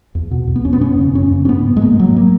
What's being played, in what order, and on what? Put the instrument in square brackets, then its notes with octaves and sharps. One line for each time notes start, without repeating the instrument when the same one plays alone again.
[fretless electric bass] E2
B2
E2
B3
B2 C#4
B3
F#2 C#4
C#3
F#2 C#4
C#3
C#4
G#2 B3
G#2
G#3
G#2 A#3
G#2 F#3
A#3